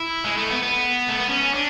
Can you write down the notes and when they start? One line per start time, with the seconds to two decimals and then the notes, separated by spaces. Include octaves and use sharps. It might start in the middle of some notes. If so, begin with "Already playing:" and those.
Already playing: E4
0.24 G#3
0.38 A3
0.51 B3
0.63 B3
1.08 A3
1.18 B3
1.29 C#4
1.54 D4